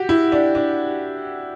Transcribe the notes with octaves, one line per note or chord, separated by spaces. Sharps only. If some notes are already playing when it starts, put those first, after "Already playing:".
Already playing: F#4 G4
E4
D4
D4